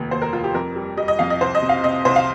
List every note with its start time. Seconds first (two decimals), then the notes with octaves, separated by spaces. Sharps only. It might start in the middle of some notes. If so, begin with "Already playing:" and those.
Already playing: F1 D#2
0.11 D#2 C5
0.22 A#4
0.33 F1 F4
0.44 G4
0.54 F2 A#4
0.76 G3
0.97 G3 D#5
1.08 D#5
1.19 F2 F5
1.30 D#5
1.41 C2 C5
1.55 D#5
1.62 C3
1.69 F5
1.84 C3 D#5
2.05 C2 C5
2.16 F5